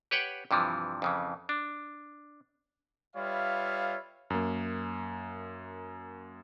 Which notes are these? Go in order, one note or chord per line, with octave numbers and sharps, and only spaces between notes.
G4 B4 C#5 F#5 G5
G2 C3 E3 F3
F2 C#3 E3
D4
G3 F4 B4 C#5 E5 F5
F#2 A#3